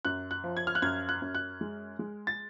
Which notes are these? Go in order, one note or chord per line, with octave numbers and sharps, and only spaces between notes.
F#2 F#6
F#6
F3
G#6
F6
F#6
F#2 G#6
F#6
F#2
F#6
G#3
G#3
A6